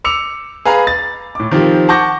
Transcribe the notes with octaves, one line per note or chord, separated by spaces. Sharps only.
D6 E6 C#7 F7
G#4 B4 F5 A#5
A6
A2 D6
D#3 F3 C4 G4
F#5 A5 C#6 D6 G6 A#6